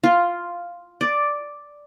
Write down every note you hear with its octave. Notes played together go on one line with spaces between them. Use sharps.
F4
D5